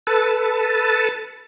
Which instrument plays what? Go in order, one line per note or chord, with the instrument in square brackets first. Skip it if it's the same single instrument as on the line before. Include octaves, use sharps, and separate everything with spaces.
[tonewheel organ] A4 B4 A5